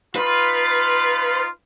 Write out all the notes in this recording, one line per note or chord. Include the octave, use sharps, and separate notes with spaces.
D#4 F4 B4